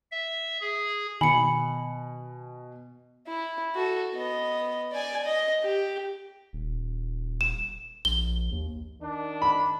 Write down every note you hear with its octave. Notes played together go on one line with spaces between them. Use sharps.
E5
G#4
B2 D#3 G#5 B5 C#7
E4
F#4 A4
B3 D#5
D5 G#5
D#5
G4
D#1
E7
A#1 G7
D#2
D#3 D4
B5